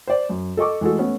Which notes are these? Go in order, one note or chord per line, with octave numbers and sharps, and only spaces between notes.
C5 D5
F#2
A4 D#5 C#6 D6
E3 G#3 A3 F#4 A4
A3 B3 C#4